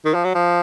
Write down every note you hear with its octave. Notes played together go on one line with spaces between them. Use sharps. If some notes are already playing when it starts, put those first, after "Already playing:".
D#3
F3
F#3
F3